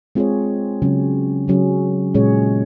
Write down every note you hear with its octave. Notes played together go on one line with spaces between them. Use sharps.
G#3 C4 F4 G#4 C#5
C#3 F#3 C#4
C#3 F#3 C#4 G#4
A#2 G#3 C#4 G#4 C#5